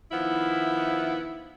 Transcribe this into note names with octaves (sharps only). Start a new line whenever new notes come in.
D#3 F3 B3 E4